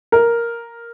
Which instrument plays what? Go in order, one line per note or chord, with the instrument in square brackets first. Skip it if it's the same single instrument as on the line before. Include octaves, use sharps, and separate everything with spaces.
[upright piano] A#4